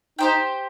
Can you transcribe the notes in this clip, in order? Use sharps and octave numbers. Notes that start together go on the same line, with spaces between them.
D#4 G4 C5 G5